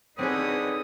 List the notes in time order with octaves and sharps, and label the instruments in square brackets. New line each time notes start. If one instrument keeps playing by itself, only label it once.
[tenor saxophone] D3 [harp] C4 G#4 [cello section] D#4 B4 C#5 [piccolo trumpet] D#6